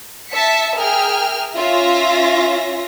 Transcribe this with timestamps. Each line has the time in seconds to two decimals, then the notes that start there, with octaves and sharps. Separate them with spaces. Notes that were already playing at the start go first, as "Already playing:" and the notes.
0.30 E5 A5 B6 C#7
0.76 G#4 A#4 E5 G5 F6
1.56 C#4 F4 E5 A#6